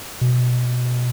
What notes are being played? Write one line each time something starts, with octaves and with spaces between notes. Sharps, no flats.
B2